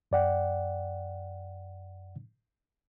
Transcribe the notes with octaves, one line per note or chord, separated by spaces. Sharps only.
F#2 D5 F#5 G5